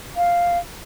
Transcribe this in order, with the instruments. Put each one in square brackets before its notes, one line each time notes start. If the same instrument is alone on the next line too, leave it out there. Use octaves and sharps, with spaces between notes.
[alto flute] F5